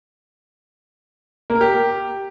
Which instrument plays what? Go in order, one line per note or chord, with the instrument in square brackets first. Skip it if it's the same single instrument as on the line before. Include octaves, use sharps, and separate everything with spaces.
[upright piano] A#3
A#4
G4